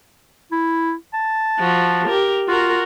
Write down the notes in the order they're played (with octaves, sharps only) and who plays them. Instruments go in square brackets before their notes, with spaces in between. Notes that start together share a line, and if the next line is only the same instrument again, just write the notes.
[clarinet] E4
A5
[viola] F3 F#4
G4 A#4
[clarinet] F4 [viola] F#4 A#4